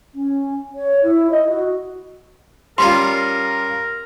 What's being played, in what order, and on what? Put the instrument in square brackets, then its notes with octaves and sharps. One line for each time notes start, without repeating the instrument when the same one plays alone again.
[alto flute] C#4
C#5
E4
D#5
F#4
[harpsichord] G3 C#4 F4 [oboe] A#4 [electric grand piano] C6